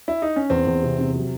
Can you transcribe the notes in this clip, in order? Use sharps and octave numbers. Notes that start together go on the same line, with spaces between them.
E4
D#4
C#4
E2 C4
E2
C3
C3
F#3